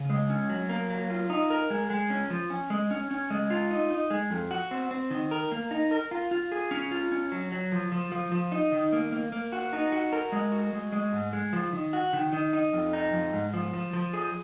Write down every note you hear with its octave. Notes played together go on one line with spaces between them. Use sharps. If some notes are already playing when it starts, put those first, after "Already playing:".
Already playing: C#3
G#3
C#4
F#3
A#3
F#3
F4
D#4
A#4
G#3
G#3
C#4
F3
C#4
G#3
C#4
C#4
G#3
F4
D#4
D#4
G#3
F2
F#4
C4
C4
D#3
A#4
A#3
D#4
A#4
F4
F4
G#4
C#4
F4
C#4
F#3
F#3
F3
F3
F3
F3
D#4
D#3
A#3
A#3
A#3
F#4
D#4
F#4
A#4
G#3
F#4
G#3
G#3
G#2
G#3
F3
D#3
F#4
D#3
D#3
D#4
F2
D#4
F2
G#2
F3
F3
F3
G#4